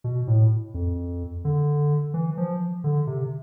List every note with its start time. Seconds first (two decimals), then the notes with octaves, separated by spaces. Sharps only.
0.04 B2
0.27 A2
0.74 F2
1.45 D3
2.14 E3
2.37 F3
2.84 D3
3.07 C3